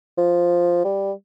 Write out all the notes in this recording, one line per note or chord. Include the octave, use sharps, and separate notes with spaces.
F3
G3